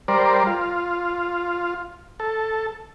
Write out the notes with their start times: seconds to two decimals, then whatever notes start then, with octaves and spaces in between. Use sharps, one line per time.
0.08 G3 A#4 C5 D5
0.47 F4
2.20 A4